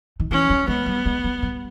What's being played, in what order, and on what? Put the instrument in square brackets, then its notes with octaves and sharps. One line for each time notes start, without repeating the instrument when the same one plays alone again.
[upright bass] D#3
[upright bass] E3 [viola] C#4
[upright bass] G3
[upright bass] G#3 [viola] B3
[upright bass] G3
G#3
G3
G3